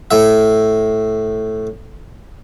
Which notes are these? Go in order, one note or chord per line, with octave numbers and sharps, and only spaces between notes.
A2 E5